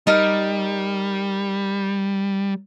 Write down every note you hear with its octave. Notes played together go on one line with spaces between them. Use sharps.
G3 D#4 A#4